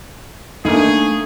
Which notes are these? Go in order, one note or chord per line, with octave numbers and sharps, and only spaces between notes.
A3 A#3 D4 D#4 G#4